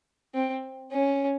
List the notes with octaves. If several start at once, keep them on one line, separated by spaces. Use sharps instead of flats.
C4
C#4